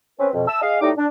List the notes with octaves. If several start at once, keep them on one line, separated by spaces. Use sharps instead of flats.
C4 C#4 B4
F2 B2
E5 A5 E6
G#4 D#5 F5
A2 G3 D#4 D6
D4